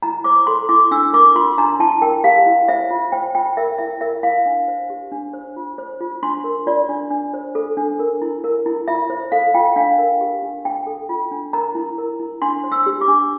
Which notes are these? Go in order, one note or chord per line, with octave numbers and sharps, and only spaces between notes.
E4 A#5
C5 D6
A4 C6
E4 D6
D4 E6
A#4 D6
F4 C6
D4 A#5
E4 A5
A#4 G5
G4 F5
E4
C5 E5
F4
C5 G5
F4 G5
A#4 E5
E4 E5
A#4 E5
E4 F5
D4
C5
G4
D4
C5
F4
C5
F4
D4 C6
A#4
F4 D5
D4
D4
C5
A4
D4
A#4
E4
A#4
E4
F4 E5
C5
A4 F5
F4 G5
D4 F5
A#4
G4
D4
D4 G5
A4
F4
D4
A#4 A#5
E4
A#4
E4
D4 C6
C5
E6
G4
D6
D4